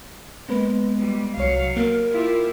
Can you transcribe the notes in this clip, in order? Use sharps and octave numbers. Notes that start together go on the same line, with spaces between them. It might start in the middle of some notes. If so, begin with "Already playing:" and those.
G#3 A#3 B3 B4
G3
C2 F#3 C#5 F5 C#7
A#3 A#4
E4 F4 G4